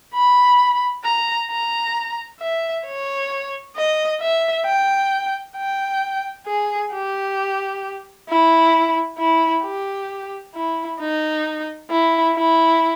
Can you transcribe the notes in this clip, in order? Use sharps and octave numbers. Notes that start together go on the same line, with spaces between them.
B5
A#5
A#5
E5
C#5
D#5
E5
G5
G5
G#4
G4
E4
E4
G4
E4
D#4
E4
E4